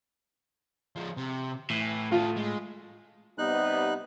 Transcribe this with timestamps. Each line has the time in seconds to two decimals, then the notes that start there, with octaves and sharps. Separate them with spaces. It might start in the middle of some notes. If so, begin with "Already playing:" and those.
0.96 F3 G#3
1.17 C3
1.70 A2 E3
2.12 F4 F#4 A4
2.37 G#3
3.38 C3 G3 B3 D#4 F#6